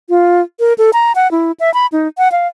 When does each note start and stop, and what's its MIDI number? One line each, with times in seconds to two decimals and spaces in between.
0.09 0.41 65
0.60 0.73 70
0.78 0.91 69
0.93 1.12 82
1.15 1.30 78
1.31 1.52 64
1.60 1.73 76
1.74 1.86 83
1.92 2.08 63
2.18 2.31 78
2.32 2.47 77